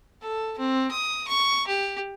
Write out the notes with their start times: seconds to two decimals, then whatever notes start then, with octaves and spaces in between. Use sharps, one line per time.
0.22 A4
0.58 C4
0.91 D#6
1.28 C#6
1.67 G4